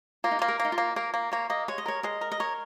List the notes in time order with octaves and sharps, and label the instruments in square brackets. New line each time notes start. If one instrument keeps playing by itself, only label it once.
[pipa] A#3 [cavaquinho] F4
[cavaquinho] D#4
F4
[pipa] A#3
[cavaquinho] A#4
[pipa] A#3 [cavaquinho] D#4
[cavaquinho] F4
[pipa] A#3
[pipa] A#3 [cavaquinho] A#4
[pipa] A#3
[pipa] A#3 [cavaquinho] C#5
[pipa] A#3 [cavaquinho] D#5
[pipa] G#3 [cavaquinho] C#5
[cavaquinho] D#5
[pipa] A#4 [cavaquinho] C#5
[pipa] G#3 [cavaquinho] D#5
[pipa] A#4
[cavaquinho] D#5
[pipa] A#4 [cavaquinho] C#5